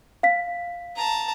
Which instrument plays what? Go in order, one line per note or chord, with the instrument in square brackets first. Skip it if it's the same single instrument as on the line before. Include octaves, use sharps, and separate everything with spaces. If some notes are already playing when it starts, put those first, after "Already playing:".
[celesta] F5 B6
[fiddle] A5 A#5